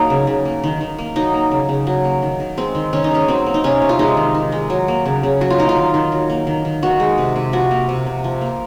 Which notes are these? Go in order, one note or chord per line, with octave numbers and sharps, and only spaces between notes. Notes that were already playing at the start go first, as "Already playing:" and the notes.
Already playing: F#3 A#3 D#4
C#3
C#3
A#3
D#3
D#3
A#3
F#3 D#4
A#3
C#3
C#3
F#3
A#3
D#3
D#3
G#3 C4
D#3
D#3 C#4
D#4
G#3 C#4
F#3 C4
A#3
D#4
C3 C#4
C3
F4
G#3 D#4
D#3
D#3
G#3
F#3
A#3
C#3
C#3
F#3 F#4
F4
A#3 D#4
F4
D#3
D#3
F#3
A#3
D#3
D#3
D#3 F#4
G#3
C3
C3
F3 F#4
A#3
C3
C3
F3
A#3